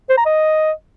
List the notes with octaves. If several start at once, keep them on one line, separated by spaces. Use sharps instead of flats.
C5
A#5
D#5